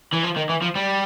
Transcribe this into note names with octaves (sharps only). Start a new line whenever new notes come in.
E3
F3
D#3
E3
F3
G3